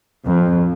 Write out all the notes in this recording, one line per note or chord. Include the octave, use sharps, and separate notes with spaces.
F2